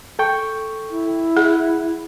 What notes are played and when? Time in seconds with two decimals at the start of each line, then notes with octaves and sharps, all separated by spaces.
0.19 A4 G5 C#6
0.90 E4
1.37 G#4 F#5